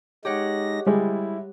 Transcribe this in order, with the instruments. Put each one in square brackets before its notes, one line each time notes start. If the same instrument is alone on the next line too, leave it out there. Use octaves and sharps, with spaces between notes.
[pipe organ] G#3 D#4 A#6 [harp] G4 C#5 F#5
[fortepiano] G3 G#3 [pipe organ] E4